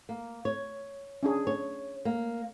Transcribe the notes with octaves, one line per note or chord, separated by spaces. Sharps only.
A#3
C#5
C#4 D4 G#4
C#5
A#3